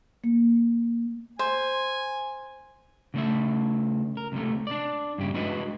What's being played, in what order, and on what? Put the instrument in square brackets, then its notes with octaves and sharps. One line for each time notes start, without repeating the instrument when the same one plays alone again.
[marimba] A#3
[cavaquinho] C5 [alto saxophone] G#5
[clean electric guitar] C#3 A3 E5
A#4
C#2 C3 A3
D4 D5
G2 C#3 G4
G#3 D4 E4 F#4 B4 D#5